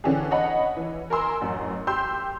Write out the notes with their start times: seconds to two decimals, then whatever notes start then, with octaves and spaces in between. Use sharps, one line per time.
0.04 D3 E3 C#4 D4 G4 G#4
0.31 C#5 D#5 F#5 B5
0.77 E3
1.10 A#4 G#5 A#5 C6 E6
1.41 A1 F#2
1.87 G4 C6 E6 G6